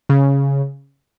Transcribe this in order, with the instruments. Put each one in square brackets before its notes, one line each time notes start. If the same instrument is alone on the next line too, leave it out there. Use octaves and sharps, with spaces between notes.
[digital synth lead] C#3